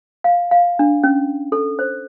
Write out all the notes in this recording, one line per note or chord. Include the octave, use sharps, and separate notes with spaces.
F5
F5
D4
C#4
A4
C5